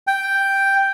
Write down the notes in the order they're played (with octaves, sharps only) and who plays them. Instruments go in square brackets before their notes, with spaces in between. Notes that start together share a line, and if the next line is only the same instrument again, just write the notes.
[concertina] G5